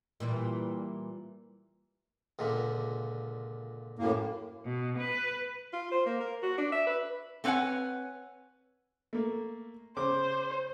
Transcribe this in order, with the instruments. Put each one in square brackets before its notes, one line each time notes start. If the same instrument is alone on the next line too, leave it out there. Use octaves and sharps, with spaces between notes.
[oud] A#2 E3 G3
[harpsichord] C#2 A#2 D3
[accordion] F#2 A2 A#3
[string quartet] B2
B4
[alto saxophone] F4
C5
A#3
A#4
F#4
D4
E5
B4
[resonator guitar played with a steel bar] A3 C4 B4 C#5 F#5 G#5
[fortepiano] A3 A#3
[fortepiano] C#3 D6 [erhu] C5